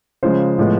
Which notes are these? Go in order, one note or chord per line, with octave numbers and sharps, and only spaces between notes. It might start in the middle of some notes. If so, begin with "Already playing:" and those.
C#3 F3 G#3 C5
A2 F3 G#3 B3